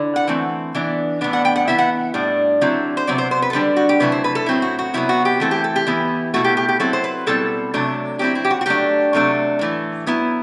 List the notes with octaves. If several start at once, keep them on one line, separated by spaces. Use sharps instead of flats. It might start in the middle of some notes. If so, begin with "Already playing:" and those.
Already playing: D3 E4
F#5
E3 A3 C4
E3 B3 D4
A2 E3 B3 D4
F#5
G5
F#5
E3 B3 E4 E5
F#5
A2 G3 D4
D3 F#3 C4 E4
C5
C3 F#3 B3 D5
C5
C5
B4
A4
D3 G3 D4 B4
F#4
G4
C3 F#3 A3 E4 B4
C5
B4
A4
A2 F#3 C4 E4
F#4
F#4
C3 F#3 B3 E4
F#4
G4
E3 A3 C4 E4 A4
G4
A4
G4
E3 B3 E4
B2 A3 E4 F#4
G4
G4
G4
F#3 C4 E4 A4
C5
B4
B2 G3 C4 E4 A4
C3 F#3 A3 D4
F#3 C4 E4 G4
E4
G4
F#4
F#4
F#3 A3 D4 G4
C3 F#3 A3 D4
A2 E3 A3
F#3 B3 E4